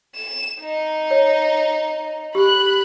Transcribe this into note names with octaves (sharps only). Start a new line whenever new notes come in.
E7
D#4
C#5
G4 B5 F#6